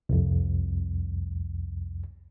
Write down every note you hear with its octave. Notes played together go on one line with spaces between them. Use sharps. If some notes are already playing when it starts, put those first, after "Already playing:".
C2 F2